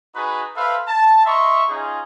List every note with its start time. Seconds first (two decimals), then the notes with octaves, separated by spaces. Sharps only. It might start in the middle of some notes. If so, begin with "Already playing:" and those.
0.15 D#4 F#4 G#4 B4
0.55 A4 B4 C5 E5 F5
0.88 A5
1.25 D#5 E5 A#5 C6 C#6
1.69 C#4 D#4 F4 G#4